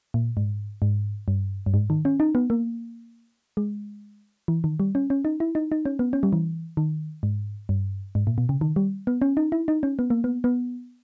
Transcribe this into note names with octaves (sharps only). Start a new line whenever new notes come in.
A#2
G#2
G#2
G2
G2
G#2
D#3
C#4
D#4
B3
A#3
G#3
E3
D#3
G3
C#4
C#4
D#4
E4
D#4
D#4
C#4
B3
C#4
G3
E3
D#3
G#2
G2
G#2
A#2
B2
C#3
D#3
G3
B3
C#4
D#4
E4
D#4
C#4
B3
A#3
B3
B3